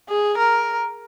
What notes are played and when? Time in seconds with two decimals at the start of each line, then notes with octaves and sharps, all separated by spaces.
0.09 G#4
0.38 A#4